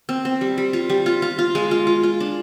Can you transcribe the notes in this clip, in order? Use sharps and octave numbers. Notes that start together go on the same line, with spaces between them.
C4
C4
G3
G3
F4
G3
F4
F4
F4
G#3
F4
F4
F4
D4